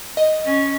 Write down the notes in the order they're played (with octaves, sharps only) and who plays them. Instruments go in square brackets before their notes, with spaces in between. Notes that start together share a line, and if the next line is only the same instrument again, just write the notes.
[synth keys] D#5
[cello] C#4